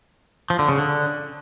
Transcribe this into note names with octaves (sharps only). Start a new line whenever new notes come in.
F3
D3
C#3
D3